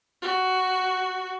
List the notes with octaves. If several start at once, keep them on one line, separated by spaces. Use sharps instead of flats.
F#4